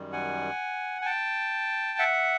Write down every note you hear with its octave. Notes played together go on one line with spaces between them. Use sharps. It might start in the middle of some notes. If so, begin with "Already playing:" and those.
Already playing: F#2 D#3 G3
F#5 G#5
G#5
G5 A5
E5 F#5